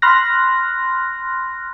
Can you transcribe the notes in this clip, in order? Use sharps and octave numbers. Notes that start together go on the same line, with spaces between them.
B5 C6 F6 F#6 A#6